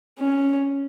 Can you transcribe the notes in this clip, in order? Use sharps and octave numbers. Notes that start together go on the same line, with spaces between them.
C#4